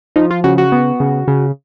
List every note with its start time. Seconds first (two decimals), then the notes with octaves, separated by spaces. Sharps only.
0.16 F3 D#4
0.31 F4
0.44 C#3 F#4
0.58 F#4
0.72 B3
1.00 C#3
1.28 C#3